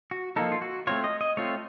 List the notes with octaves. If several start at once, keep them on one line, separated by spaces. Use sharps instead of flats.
F#4
F3 A#3 D#4 A4
F4
F#4
A3 C4 F4 C#5
D#5
D#5
A3 C4 F4 C#5